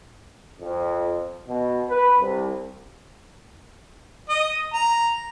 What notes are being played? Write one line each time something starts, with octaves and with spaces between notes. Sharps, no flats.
F2
B2
B4
C2
D#5
A#5